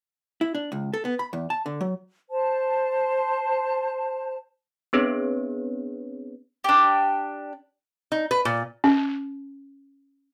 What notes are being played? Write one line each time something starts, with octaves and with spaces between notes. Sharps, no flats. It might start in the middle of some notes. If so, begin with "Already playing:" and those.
E4
D4
C#2
A4
B3
B5
E2
A5
D3
F#3
C5 A5
B3 C4 D4 G#4 B4 C#5
D4 G4
D#4
B4
A#2
C#4